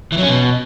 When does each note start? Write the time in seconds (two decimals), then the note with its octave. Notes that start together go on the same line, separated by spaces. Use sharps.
0.12 E3
0.17 F#3
0.23 C#4
0.28 B2